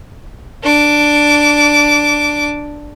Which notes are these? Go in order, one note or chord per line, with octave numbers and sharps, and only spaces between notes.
D4 D6